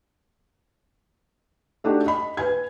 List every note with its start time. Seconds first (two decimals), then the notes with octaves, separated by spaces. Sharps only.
1.84 A3 D4 D#4 F#4 G4
2.06 D#5 B5
2.37 B4 G#5 G#6